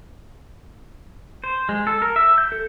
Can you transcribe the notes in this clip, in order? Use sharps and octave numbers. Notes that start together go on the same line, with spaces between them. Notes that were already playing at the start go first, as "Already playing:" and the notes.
C5
G#3
A4
A#4
E5
G6
A4